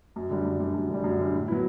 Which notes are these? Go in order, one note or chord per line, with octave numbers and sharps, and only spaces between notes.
F#2
D3 G3
F#2
D3 G3
F#2
D3 G3
F#2
D3 G3
A2
F#3 B3 E4